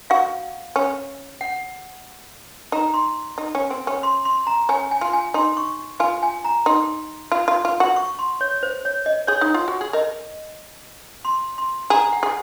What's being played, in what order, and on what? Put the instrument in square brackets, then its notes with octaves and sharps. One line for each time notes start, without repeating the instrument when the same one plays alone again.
[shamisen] F#4 [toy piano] F5
[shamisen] C#4
[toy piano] F#5
[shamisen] D#4 [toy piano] A#5
[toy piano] C6
[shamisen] D#4
C#4
C4
C#4
[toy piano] C6
C6
A#5
[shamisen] C#4 [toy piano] G#5
[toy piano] G#5
[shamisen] F4
[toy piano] G#5
[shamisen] D#4 [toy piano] C6
[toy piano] C#6
[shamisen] F4 [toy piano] G#5
[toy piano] G#5
A#5
[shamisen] D#4 [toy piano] C6
[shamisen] F4
F4
F4
F#4
[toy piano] C#6
C6
C#5
C5
C#5
D#5
[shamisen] G#4 [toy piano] C#5
[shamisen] D#4
F4
F#4
G#4
[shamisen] A#4 [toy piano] D#5
[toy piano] C6
C6
[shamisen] G#4 [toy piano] A#5
[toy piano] F#5
[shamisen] G#4